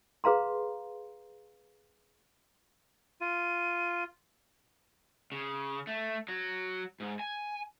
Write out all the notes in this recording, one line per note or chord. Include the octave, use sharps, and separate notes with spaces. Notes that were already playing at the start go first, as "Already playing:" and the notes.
G#4 B4 F5 A#5 C6
F4 D#7
C#3
A3
F#3
G#2
G#5